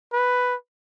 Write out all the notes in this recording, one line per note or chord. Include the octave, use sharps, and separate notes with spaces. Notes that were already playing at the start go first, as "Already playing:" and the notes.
B4